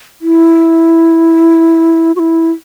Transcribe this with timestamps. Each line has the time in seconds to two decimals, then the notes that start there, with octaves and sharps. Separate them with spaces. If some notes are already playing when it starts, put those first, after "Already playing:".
0.22 E4
2.16 F#4
2.19 E4